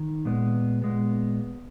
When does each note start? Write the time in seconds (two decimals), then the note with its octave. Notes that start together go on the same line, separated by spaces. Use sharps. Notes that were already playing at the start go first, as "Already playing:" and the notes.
Already playing: D#3
0.25 A#2 G#3 B3
0.82 A#2 G#3 B3